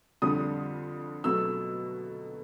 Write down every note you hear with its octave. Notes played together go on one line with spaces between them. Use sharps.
F2 D3 G3 D#6
B2 F#3 A3 E6